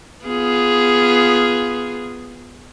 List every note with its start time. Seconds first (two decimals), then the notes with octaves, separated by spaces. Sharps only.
0.24 B3 F4 G#4